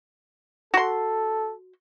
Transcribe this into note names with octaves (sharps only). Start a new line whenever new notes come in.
F#4 A4 C6